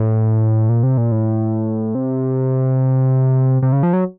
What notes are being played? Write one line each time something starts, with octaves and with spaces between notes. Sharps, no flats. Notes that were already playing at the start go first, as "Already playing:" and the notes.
Already playing: A2
A#2
C3
A#2
A2
C3
C3
C#3
F3
F#3